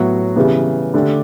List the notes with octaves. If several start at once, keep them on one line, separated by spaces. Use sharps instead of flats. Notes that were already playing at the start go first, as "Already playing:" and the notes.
Already playing: A2 F#3 B3 F#4
C#3 E3 G3 B3
D3 A3 D4 G4